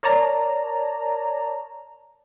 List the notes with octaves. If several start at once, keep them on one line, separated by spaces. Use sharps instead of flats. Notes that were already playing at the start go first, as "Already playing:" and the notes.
A#4 C#5 D5 A5 A#5